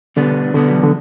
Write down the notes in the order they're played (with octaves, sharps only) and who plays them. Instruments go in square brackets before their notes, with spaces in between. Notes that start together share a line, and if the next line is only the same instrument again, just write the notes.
[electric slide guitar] B2 G3 B3 D4 [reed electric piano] D3
[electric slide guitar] B2 G3 B3 D4 [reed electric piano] D3
[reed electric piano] F#3
E3
D3